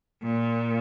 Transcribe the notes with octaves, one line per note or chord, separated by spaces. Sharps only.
A#2